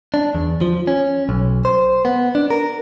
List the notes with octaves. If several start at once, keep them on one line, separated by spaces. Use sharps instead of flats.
D4
E2
F3
C#4
B1
C5
B3
D4
A#4